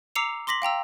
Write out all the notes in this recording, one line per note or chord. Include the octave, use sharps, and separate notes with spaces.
A#5 D6 E6 C7 C#7 F7
C6 D6 A#6 B6 F#7
F5 G5 A#5 E6